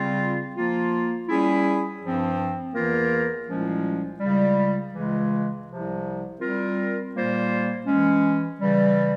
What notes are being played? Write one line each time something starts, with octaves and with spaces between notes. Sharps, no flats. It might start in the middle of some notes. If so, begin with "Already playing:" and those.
Already playing: C#3 G3 C4 F4
F3 A#3 F4
G3 C#4 E4 G#4
G2 F3 C4
E2 E3 A#3 F4 A#4
C2 A#2 F3 G#3 C#4
C#2 C#3 G3
C#2 C#3 E3 G#3
C2 C3 F3
G3 C4 F4 A#4
A#2 G3 A#3 F4 C5
E3 G#3 C#4
C#3 E3 G3